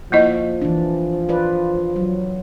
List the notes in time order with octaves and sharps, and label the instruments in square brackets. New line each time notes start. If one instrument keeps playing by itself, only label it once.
[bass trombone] F3 [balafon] A#3 E4 D#5
[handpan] E3 D4
F4 B4 D5
F#3